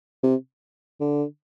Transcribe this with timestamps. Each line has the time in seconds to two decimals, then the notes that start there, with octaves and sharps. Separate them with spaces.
0.23 C3
1.01 D3